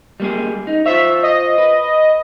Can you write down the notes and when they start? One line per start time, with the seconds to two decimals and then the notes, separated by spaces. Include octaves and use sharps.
0.20 G3 A#3 G#4
0.67 D#4
0.86 F4 C5 C#5 E5
1.23 D#5
1.58 B4